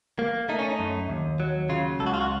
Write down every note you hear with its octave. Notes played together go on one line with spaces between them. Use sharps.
A#3
A3 D#4
C#4
D#4
F#2
D#2
F#3
C#3 F4
C#2 A4
F#4
F4
F#4